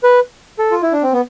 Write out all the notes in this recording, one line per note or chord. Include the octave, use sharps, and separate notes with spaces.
B4
A4
F4
E4
D4
C4
B3